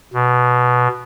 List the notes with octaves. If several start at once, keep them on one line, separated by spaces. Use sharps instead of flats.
B2